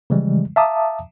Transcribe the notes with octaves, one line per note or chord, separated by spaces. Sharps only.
C#3 E3 F3 G3 G#3
E5 F5 A5 A#5 D6 D#6